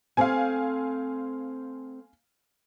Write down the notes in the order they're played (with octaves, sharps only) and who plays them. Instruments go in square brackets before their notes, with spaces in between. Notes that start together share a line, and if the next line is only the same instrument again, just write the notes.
[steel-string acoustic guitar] A3 C4 C5 [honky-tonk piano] F5 G#5